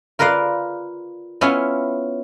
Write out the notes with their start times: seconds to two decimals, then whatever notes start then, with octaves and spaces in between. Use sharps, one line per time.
0.19 F4 A#4 B4 D5 F5
1.41 B3 C#4 E4 F4